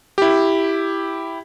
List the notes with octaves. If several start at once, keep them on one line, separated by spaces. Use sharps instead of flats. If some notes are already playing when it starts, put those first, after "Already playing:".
E4 G4